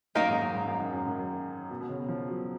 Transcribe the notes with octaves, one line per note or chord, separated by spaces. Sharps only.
F#2 D#3 A#3 D#4 A#4
G#2
F#2
G#2
F#2
G#2
F#2
G#2
F#2
B2
B2
C#3
F3
F#3